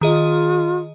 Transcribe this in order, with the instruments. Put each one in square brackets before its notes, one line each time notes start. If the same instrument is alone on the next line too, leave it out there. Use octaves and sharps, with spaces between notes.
[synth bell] D#3 G#4 D#5 [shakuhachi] F4